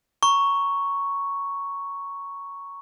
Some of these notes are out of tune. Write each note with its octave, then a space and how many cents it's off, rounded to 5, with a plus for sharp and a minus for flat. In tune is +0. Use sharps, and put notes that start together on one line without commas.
A#5 +0 C#6 +0